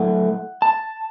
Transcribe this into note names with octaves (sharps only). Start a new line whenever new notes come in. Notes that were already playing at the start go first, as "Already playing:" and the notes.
Already playing: A2 F#3 A3 E4 F#5
A5